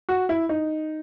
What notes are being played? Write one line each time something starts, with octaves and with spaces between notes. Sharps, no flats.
F#4
E4
D#4